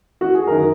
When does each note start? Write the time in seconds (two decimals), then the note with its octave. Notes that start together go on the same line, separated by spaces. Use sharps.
0.21 F#4
0.35 G#4
0.47 F#2 D#3 A#4